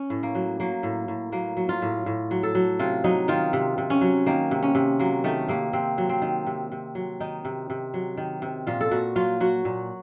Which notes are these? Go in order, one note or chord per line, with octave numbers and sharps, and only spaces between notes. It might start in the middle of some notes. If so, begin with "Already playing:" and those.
Already playing: C#4
A2
A#3
F#3
F#3 A#3
A2
A2
F#3 A#3
F#3
F4
A2
A2
F#3
A4
F#3
C3 F4
F#3 D#4
D#3 F4
C3
C3
C#4
F#3
D#3 A#3
C3
C#4
C3
F#3 A#3
D#3 A3
C3 A#3
C3 C4
F#3
C4
D#3
C3
C3
F#3
D#3 D#4
C3
C3
F#3
D#3
C3
A#2 F4
A4
A#2 F#4
F#3 F4
F#3 F#4
A#2